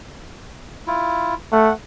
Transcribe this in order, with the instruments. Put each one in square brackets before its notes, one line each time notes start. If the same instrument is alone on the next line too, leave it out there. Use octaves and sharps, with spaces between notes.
[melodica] E4 F4
[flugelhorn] A3 [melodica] F#5